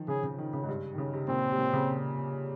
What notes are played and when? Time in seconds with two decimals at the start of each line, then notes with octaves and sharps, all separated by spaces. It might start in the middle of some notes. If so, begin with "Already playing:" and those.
Already playing: D#3 F3
0.08 C#3 G#4
0.24 C#3
0.38 D#3
0.53 C#3
0.63 G#2
0.68 G2
0.94 D#3
0.98 C#3
1.13 C3
1.28 A#2 C4
1.52 C3
1.58 A#2
1.73 C#3